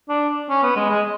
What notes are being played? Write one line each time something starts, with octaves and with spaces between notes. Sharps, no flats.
D4
C#4
B3
G#3
G#3